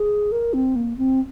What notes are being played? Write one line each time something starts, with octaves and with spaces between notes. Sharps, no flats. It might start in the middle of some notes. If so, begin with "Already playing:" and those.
Already playing: G#4
A#4
C4
A#3
C4